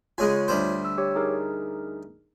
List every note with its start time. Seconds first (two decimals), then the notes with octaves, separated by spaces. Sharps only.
0.18 C#3 G#3 F4 C#5 G#5
0.48 D2 G3 C5
0.85 E6
0.98 G4 C#5
1.15 D#4 G#4 A#4